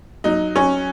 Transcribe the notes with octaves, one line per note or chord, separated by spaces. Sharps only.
F#3 D#4
F#3 C#4